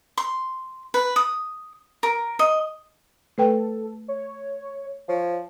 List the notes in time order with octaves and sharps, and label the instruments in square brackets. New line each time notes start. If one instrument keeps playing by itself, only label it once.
[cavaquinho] C6
B4
D#6
A#4
D#5
[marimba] A3 B4 G5 [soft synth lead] A4
[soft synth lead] C#5
[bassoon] F3 [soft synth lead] C#5